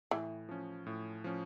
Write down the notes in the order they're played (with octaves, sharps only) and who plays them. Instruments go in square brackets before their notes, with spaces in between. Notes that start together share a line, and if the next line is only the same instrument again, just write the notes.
[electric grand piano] A2 [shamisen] E3
[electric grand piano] F3 C#4
A2
F3 C#4